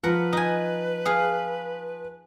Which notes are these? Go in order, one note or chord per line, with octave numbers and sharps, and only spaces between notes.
F3 A#4 B4 F#5
D#4 G#5
G#4 F5